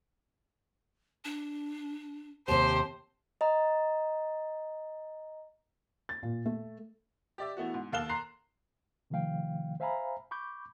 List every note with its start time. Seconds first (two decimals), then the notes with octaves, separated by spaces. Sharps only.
1.25 D4
2.48 D#2 C3 G4 C5 A5
3.41 D#5 A#5
6.09 A6
6.23 A#2
6.46 A3
7.38 G4 D5 E5
7.57 E3 A3 B3 F#4
7.74 G#2
7.92 D#2 A4 F5 F#6 E7 G7
8.09 A#5 C6 F#6 C7
9.10 C3 D#3 F3 A3 F5 G5
9.80 C5 E5 F5 G#5 A#5 B5
10.31 B5 C#6 D6 G6